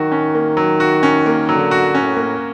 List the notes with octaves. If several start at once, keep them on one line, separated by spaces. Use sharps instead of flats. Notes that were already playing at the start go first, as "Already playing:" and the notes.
Already playing: D#3 F#3 F#4
C#4
A#3
F#3
F#4
C#4
A#3
D3 F#3
F#4
A2 C#4
A#3